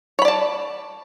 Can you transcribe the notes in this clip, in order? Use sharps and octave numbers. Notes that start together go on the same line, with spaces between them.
C#5 D5 A5 B5